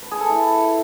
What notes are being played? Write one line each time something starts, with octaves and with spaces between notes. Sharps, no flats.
B4
G#4
A4
E4